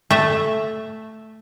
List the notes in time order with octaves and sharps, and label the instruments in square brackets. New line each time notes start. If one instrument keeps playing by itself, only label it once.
[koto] A3 E5